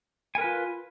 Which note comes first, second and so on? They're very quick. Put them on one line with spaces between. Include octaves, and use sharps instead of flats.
G#5 A#4 B4 F4